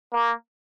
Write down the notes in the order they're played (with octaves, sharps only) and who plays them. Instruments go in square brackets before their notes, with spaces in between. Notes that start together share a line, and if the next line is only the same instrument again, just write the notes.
[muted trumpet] A#3